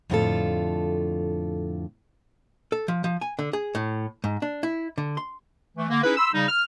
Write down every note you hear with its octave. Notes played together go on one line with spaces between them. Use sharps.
F2 A2 D3 D#4 F4 A4
A4
F3
F3
G#5
D3
G#4
A2
G#2
D4
E4
D3
C6
E3 A3
D3 A#3
C#4 D#4 E4 G#4 B4
B5 C6 E6
C#3 G3 D#4
F6